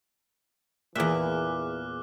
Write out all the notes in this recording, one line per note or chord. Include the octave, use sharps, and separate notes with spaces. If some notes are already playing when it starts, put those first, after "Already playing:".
E2 A#2 E3 G#4 E5 D6 F6 F#6